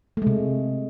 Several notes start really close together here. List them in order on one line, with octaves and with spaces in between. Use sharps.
A3 G#3 C3